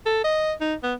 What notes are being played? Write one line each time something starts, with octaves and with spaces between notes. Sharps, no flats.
A4
D#5
D#4
B3